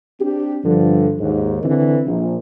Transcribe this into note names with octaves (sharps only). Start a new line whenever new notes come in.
C4 D4 G4
G2 D3 F3
D#2 G#2
D3 E3 C4
A#1